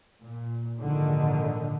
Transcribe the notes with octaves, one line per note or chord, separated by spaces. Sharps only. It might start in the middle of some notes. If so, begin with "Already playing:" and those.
A#2
A#1 G#2 D3 D#3